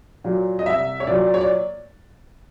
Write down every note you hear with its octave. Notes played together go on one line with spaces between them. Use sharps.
A#2 F#3
D#5
C2 E5
C#5
A#2 F#3 D5
C#5
D5